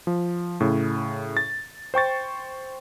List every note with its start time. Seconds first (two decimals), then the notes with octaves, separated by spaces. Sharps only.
0.07 F3
0.60 A2 C#3
1.37 A6
1.94 C5 G5 C#6 A6